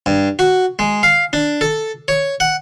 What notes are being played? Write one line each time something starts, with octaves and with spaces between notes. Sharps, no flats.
G2
F#4
G#3
F5
D4
A4
C#5
F#5